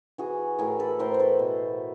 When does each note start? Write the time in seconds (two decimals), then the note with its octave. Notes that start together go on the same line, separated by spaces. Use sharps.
0.18 E3 F#4 G#4
0.59 A2 G#4 A#4
0.79 A4 B4
0.99 A2 A#4 C5
1.14 C5
1.19 A4 B4
1.39 B2